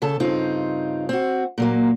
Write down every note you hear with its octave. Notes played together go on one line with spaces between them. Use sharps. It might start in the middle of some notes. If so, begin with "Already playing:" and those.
C#3 A4 A5
G2 C#3 C4 D#4 F4
C4 F#4
A#2 F#3 A#3